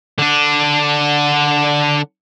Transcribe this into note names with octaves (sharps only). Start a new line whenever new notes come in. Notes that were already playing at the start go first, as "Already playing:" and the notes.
D3 D4